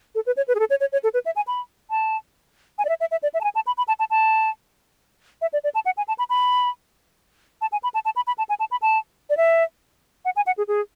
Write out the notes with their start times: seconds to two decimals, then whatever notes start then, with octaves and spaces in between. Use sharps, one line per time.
0.15 A4
0.26 B4
0.37 C#5
0.48 B4
0.55 G#4
0.59 A4
0.70 C#5
0.80 C#5
0.92 C#5
1.03 A4
1.14 B4
1.26 E5
1.36 G#5
1.47 B5
1.90 A5
2.78 G#5
2.85 D5
2.89 E5
3.00 E5
3.11 E5
3.23 D5
3.34 E5
3.41 A5
3.44 G#5
3.55 A5
3.67 B5
3.78 B5
3.88 A5
3.99 A5
4.10 A5
5.42 E5
5.53 D5
5.64 D5
5.75 A5
5.86 F#5
5.97 G#5
6.08 A5
6.19 B5
6.30 B5
7.61 A5
7.72 G#5
7.83 B5
7.94 A5
8.05 A5
8.16 B5
8.27 B5
8.38 A5
8.49 G#5
8.60 A5
8.71 B5
8.82 A5
9.30 D5
9.37 E5
10.25 F#5
10.36 G#5
10.47 F#5
10.58 G#4
10.68 G#4